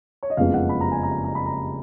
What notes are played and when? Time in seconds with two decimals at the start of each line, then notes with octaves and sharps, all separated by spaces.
0.23 C#5
0.30 D#5
0.37 F#1 F2 C#3 G#3 B3 F5
0.54 F#5
0.69 B5
0.81 A#5
0.92 G#5
1.03 A#5
1.24 A#5
1.35 B5
1.46 A#5